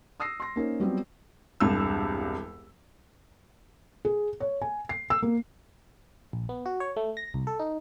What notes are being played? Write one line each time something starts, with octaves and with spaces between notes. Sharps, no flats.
D#6 E6 A#6 C7
C6 A#6
A#3 C#4 D#4 C5
F#3 G3 B3 C4 F4
E1 C2 G2 E6
G#4
C#5
G#5
C7
E6
A#3
A#1
B3
F#4
C#5
A3
A#6
C2
A4
D#4